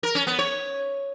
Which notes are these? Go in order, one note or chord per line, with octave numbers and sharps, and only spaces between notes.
A#4
C#4
B3
C#5